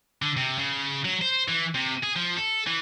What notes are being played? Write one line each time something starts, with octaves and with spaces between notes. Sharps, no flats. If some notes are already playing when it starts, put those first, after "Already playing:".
D3
C3
C#3
F#3
C5
E3
C3
G#4
F3
A4
E3